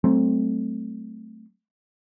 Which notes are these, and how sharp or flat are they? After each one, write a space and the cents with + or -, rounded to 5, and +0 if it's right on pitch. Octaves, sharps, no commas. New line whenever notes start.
F#3 +40 A3 +0 C4 +0